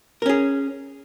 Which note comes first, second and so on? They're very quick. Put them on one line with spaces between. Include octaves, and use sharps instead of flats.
A#4 C#4 G#4